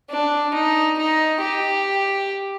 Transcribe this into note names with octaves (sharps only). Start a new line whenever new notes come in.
D4
D#4
D#4
G4